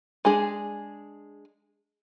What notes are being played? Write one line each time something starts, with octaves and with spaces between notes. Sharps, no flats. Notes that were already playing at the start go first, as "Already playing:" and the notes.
G#3 D4 G#4